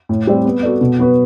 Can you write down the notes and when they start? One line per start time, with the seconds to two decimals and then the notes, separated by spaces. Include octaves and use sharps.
0.09 A2
0.27 G3 C4 G4 D5
0.45 B3
0.63 F#4 A4 D5
0.81 B2
0.99 F#3 B3 F#4 B4